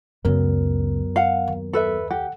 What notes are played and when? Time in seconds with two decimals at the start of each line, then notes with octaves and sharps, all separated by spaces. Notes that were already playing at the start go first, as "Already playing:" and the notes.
0.25 C#2 F#2 C#3 F#3 B3 A#4
1.16 F5 F#5
1.47 D#2
1.73 A4 B4 E5
2.11 G4 F#5